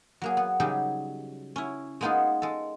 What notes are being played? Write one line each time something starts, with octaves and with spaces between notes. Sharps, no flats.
F#3 A#3 G#4
B3
C#3 F#3 G3 D#4 G4 G#4
C#4 E4
G#3 A#3 B3 D#4 F4 G#4
G#3 A4